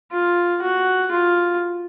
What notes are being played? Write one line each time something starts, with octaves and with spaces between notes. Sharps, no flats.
F4
F#4
F4